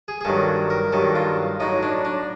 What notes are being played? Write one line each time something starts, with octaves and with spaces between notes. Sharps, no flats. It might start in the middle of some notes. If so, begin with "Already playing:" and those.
G#4
G#4
G2 D#3 F#3 A4
A#4
G2 D#3 F#3 A4
F4
A2 F#3 D#4
D4
D4